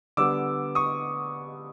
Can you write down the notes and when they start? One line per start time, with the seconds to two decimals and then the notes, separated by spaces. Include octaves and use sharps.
0.17 D3 G3 B3 D6 E6
0.75 C#6 D#6